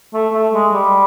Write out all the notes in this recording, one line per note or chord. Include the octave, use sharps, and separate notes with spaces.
A3
A3
G#3
G3